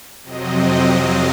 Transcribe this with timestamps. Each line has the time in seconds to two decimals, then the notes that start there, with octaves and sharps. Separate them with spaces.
0.23 F2 C3 F#3 C4 D#5
0.95 F5